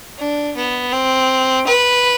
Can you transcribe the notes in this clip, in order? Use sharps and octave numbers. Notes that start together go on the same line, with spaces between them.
D4
B3
C4
B4